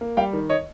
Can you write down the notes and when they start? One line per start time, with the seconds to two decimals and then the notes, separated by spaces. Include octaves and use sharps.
0.01 A#3
0.17 G3 F5 G5
0.33 D#3
0.49 C#5 D#5